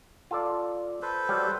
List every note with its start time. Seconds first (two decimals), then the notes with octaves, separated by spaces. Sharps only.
0.31 F4 A4 D5
1.02 A4 B4 C5
1.29 F#3 G3 G4